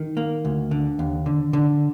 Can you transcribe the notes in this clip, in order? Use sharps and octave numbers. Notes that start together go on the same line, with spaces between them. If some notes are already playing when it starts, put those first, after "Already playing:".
Already playing: D#3
A#3
D2
D3
D#2
D3
D3